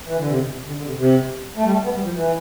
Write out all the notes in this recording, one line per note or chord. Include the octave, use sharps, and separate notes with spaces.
E3
D3
C3
B2
C3
D3
D3
C3
C3
A3
G3
A3
B3
G3
F3
E3